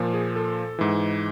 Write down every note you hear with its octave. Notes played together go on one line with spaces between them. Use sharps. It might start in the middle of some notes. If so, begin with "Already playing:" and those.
Already playing: A#2 F3
G#4
A4
G#2 E3